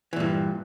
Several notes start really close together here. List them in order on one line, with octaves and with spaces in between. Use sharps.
E3 A#2 G2